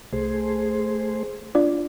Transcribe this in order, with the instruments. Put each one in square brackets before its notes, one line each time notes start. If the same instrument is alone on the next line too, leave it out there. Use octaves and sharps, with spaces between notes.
[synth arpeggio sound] C2 [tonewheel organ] A3 G#4 C5
[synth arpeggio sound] D4 F4 D5